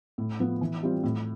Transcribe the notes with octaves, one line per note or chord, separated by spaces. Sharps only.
A2
F3 B3
E3
G3 C4 F4
A2